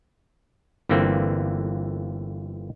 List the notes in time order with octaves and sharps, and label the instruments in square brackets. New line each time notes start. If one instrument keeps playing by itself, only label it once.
[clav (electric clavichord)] G1 D3 E3 A#3 C4